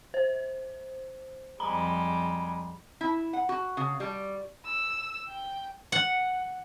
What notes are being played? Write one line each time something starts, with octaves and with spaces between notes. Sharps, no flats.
C5
F2 G3 G#3 A#5 B5
E4
F#5
F#4
C#3
G3
E6
G5
F#5